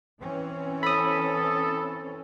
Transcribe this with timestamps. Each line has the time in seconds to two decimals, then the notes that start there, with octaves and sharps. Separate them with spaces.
0.20 E3 C4 C#4
0.83 A4 B5 D#6